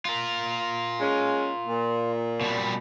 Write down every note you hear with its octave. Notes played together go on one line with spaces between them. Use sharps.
F4 A#4
G#3 C#4
A#2
B2 G3